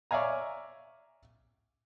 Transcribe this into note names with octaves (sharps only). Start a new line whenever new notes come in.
C#5 D5 E5 F5 G#5 A#5